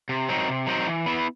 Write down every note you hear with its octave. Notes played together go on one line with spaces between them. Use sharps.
C3
F#3 C4 D#4
C3
F#3 C4 D#4
E3
B3 E4